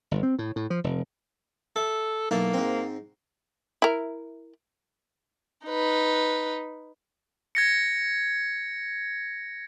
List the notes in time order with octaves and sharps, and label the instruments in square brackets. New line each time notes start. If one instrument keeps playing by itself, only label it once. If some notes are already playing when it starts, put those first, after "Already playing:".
[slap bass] G1
C4
A2
A2
F3
F1
[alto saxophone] A4 [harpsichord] E5
[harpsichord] B1 E4 A5 [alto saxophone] A#3
[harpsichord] G#2 C4
[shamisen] E4 A#4
[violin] D#4 B4
[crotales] G#6 A#6 C#7